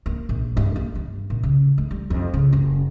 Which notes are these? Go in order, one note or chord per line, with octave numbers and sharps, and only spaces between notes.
A#3
A#1
G2
A#3
G2
A#2
C#3
A3
G3
F2
C#3
F#1